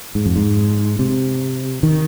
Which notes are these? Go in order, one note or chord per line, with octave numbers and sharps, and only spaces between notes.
G#2
F2
G#2
C3
D#3